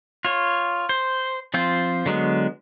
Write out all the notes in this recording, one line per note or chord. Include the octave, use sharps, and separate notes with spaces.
F4 C#5
C5
F3 C4 F4 C5
D3 F#3 G#3 B3